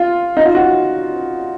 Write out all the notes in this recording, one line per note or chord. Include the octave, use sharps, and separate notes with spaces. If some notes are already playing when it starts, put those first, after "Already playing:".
Already playing: F4
D#4
F4
F#4